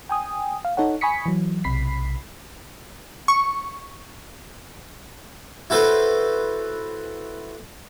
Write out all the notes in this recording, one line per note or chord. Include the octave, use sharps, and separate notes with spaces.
G5 G#5 D#6
F5
D#4 A4 C#5 F#5
G#5 B5 C#6 D#6 B6 C#7
E3 F#3
B1 C3 B5 B6 C7
C#6
E4 F#4 A4 B4 C5